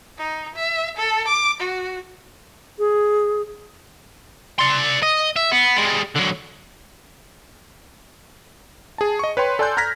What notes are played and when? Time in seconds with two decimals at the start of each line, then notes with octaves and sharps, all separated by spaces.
0.18 D#4
0.56 E5
0.97 A4
1.28 D6
1.61 F#4
2.79 G#4
4.59 D5 C6
5.03 D#5
5.36 E5
5.52 B3
5.77 G3 G#3
6.15 D3 F#3
8.98 G#4 A5
9.19 D#5 C#6
9.37 B4 C#5 G5 C6
9.59 A4 D5 G#5 C6 F#6 G6
9.77 A#5 F6 G#6 A#6 B6